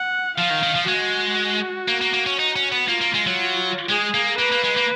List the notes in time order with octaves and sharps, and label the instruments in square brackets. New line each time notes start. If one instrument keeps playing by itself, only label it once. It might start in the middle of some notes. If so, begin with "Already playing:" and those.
Already playing: [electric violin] F#5
[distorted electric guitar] F3 [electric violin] F5
[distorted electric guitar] D#3
D#3
F3
[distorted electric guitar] G#3 [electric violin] F#4
[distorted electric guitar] A#3
A#3
A#3
C#4
D#4
C#4
B3
[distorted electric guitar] A#3 [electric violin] F4
[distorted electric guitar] A#3
G#3
F#3
[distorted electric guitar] G#3 [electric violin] G#4
[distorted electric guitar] A#3
[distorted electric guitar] A#3 [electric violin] B4
[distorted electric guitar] A#3
G#3
A#3